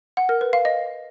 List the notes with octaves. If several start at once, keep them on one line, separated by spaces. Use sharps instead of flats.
F#5
A#4
B4
F5
D#5